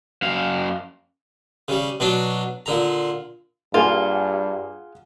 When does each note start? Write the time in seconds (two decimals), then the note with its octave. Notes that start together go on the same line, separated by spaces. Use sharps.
0.22 F#2 F5
1.68 C#3 G3
2.00 B2 F#3 D4
2.66 A#2 D3 A#5
3.74 G2 A#3 F4 G#4 F#5 G#5